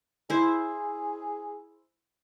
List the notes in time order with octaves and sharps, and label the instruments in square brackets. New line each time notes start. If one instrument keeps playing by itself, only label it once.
[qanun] E4 C5 [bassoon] G#4